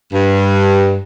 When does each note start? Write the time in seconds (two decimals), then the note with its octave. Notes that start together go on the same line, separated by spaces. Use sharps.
0.13 G2